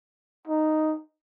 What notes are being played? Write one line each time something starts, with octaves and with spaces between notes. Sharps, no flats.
D#4